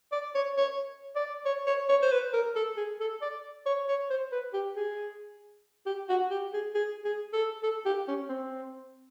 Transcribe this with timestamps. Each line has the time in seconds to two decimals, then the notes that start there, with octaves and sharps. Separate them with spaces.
0.12 D5
0.35 C#5
0.57 C#5
1.16 D5
1.45 C#5
1.67 C#5
1.89 C#5
2.02 C5
2.12 B4
2.34 A#4
2.56 A4
2.77 G#4
3.00 A4
3.21 D5
3.66 C#5
3.88 C#5
4.10 C5
4.32 B4
4.53 G4
4.76 G#4
5.86 G4
6.09 F#4
6.30 G4
6.53 G#4
6.75 G#4
7.05 G#4
7.33 A4
7.63 A4
7.85 G4
8.08 C#4
8.29 C4